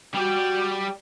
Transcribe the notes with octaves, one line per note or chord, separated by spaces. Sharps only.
G3 F#4 D5 G5